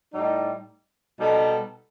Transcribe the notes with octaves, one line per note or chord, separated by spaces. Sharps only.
A2 G3 D#4
B2 G3 D#4 A4